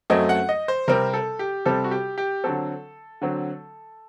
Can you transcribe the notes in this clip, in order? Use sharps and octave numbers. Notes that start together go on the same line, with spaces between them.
F#2 F#3 A3 C4 D#5
F#5
D#5
C5
C3 G3 C4 A#4
A4
G4
C3 G3 C4 A4
F#4
G4
G4
D3 F#3 C4 A4
D3 F#3 C4